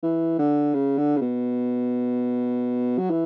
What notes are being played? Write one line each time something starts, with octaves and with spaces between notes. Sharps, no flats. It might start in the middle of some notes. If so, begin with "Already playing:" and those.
E3
D3
C#3
D3
C#3
B2
F#3
E3